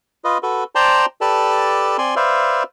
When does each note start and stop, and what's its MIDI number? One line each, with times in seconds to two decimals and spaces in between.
0.24 0.38 65
0.24 0.38 71
0.24 0.38 75
0.43 0.64 66
0.43 0.64 69
0.43 0.64 71
0.75 1.06 72
0.75 1.06 74
0.75 1.06 79
0.75 1.06 81
0.75 1.06 82
0.75 1.06 84
1.21 1.97 67
1.21 1.97 69
1.21 1.97 71
1.21 1.97 74
1.21 1.97 81
1.98 2.15 60
1.98 2.15 74
1.98 2.15 80
1.98 2.15 84
2.16 2.63 71
2.16 2.63 72
2.16 2.63 74
2.16 2.63 76
2.16 2.63 77